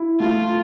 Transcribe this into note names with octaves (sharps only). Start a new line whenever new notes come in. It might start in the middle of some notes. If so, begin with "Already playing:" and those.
Already playing: E4
A3 F4